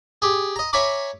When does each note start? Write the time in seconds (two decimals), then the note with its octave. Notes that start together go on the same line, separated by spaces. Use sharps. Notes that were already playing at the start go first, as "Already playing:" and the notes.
0.22 G4 G#4
0.56 D#5 A#5
0.73 C#5 E5 G#5 A#5 B5 D6